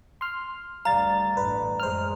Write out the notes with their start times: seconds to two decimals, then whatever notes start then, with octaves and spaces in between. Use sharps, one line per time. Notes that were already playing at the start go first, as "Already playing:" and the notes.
0.21 C6 F6
0.85 D2 G3 F5 A#5 A6
1.37 A1 G2 B4
1.80 F#2 G#3 C5 F6